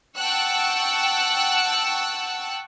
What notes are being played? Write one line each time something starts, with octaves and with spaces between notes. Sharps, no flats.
F#5 G5 A5 C#6 E6 F#6